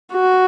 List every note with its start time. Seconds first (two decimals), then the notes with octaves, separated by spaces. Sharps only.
0.13 F#4